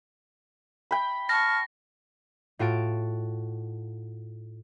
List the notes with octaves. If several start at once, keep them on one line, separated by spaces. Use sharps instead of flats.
G5 B5
A5 C#6 F6 A#6
A2 F4 F#4 A5 D7